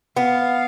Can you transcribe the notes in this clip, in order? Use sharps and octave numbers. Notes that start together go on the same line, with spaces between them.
B3 F5